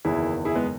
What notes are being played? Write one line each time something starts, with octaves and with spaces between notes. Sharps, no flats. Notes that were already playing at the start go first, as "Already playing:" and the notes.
F#1 E2 D#3 E4 G#4
E4 G#4
G#3 B3